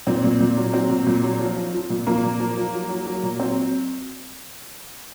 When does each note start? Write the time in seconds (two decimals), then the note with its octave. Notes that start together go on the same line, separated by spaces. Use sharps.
0.07 A#2 C4
0.24 A#2
0.40 A#2
0.57 F#3
0.73 F#3 C4
0.90 A#2
1.07 A#2
1.23 F#3
1.40 F3
1.56 F3
1.73 F3
1.90 A#2
2.07 F3 A#3
2.23 A#2
2.40 F3
2.57 F3
2.73 F#3
2.89 F#3
3.06 F#3
3.23 A#2
3.40 F#3 C4